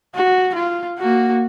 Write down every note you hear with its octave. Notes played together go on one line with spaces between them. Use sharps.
F#4
F4
A#3 F#4